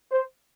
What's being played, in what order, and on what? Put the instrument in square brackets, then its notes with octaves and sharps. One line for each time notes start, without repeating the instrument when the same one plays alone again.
[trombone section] C5